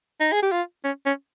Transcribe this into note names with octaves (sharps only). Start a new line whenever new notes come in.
D#4
G#4
G4
F4
C#4
C#4